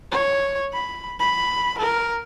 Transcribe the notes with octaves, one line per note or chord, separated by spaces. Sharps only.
C#5
B5
B5
A#4